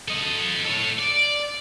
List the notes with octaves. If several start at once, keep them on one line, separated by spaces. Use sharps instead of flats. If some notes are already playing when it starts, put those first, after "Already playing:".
A4 D#5
A4 C#5
D5